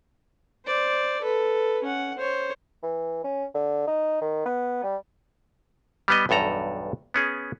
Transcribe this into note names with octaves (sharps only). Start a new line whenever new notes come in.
C5 D5
A4 B4
C#4 F#5
C5 C#5
E3
C#4
D3
D#4
D#3
B3
G3
G3 B3 D#5
B1 E2 G2 A4 A#5
B3 C#4 G#4